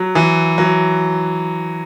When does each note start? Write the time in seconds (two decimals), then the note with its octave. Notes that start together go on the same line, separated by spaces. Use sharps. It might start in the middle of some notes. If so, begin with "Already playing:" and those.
Already playing: F#3
0.15 E3
0.58 F#3